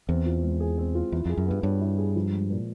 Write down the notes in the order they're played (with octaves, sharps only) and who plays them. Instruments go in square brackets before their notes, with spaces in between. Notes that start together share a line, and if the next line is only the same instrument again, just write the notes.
[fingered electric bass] E2 [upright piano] C4
[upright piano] F4
G#3
G#4
C4
F4
[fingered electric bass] E2 [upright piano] E4
[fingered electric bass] F2 [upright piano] G#4
[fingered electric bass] F#2
[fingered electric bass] G2 [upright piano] B3
[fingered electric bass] G2 [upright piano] C#5
[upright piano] E4
G#4
F3
G#3
A#2